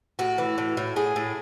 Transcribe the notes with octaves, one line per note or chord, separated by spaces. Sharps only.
A2 F#4
E3
A2
A2
A2 G#4
A2